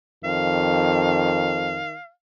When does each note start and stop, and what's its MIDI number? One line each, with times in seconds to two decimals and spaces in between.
0.24 1.80 41
0.24 1.95 51
0.24 2.10 77